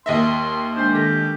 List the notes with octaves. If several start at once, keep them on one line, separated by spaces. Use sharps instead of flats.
D#2 D#5 E5 C6
G#3 D4 C5
D#3 G4 A4 A#6